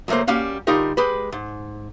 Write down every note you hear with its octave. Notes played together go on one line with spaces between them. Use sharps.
C#2 F#3 A3 A#3 C5
G3 A#3 C#4 F#4 F5
D3 G3 D#4 F4 G4 A#4
G#3 G4 B4
G#2